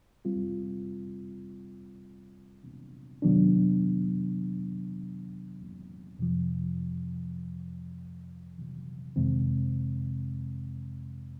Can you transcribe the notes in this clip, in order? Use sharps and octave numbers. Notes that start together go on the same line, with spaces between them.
G3 C4 F4
C3 D#3 F#3 B3 D4
F2 C3 F3
F2 C3 D#3 G#3 C4